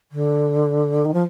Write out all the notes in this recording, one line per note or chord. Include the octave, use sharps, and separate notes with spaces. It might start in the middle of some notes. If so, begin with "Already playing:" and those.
D3
D#3
F3